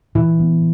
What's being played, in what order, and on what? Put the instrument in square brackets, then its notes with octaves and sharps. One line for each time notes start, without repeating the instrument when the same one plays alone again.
[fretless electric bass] A#2 [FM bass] E3
[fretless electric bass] B3